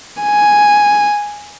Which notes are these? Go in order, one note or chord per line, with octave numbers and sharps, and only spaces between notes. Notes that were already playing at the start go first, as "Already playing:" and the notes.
G#5